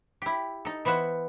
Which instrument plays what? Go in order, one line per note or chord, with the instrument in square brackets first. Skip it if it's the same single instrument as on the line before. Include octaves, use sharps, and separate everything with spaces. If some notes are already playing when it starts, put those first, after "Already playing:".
[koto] E4 G4
D#4 A4
E3 B3 C5 E5 F#5